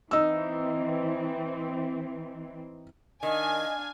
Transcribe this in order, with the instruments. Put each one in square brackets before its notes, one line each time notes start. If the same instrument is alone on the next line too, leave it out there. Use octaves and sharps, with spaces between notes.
[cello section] E3 C4 [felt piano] D#4 E6
[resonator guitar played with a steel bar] D#3 [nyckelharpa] D4 F5 [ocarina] D#5 [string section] G#5